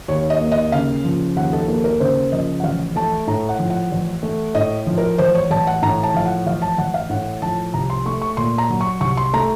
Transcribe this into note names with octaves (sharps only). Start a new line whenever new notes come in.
D#2 C#5
D#5
A#3
D#5
C#3 F5
F3
D#2 F#5
A4
A#3 A4
A#4
C#3 C5
F3 D#5
F#5
A1 F5
A3 A5
A2 A#5
F#5
F3
F#5
A1
A3
A2 D#5
F3
A#4
A1 C5
C#5
A1 A5
F#5
A2 A#5
A5
F3 F5
F#5
A1 F5
A5
A1 F#5
F5
A2 F#5
F3 A5
C2 A#5
C6
A3 C#6
C#6
A#2 C6
A#5
F#3
C#6
C2 C#6
C6
A3 A#5